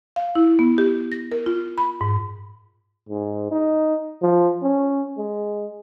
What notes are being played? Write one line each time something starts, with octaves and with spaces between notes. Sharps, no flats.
F5
E4
B3
G4
A#6
A#4
F4
B5
G#2
G#2
D#4
F3
C#4
G#3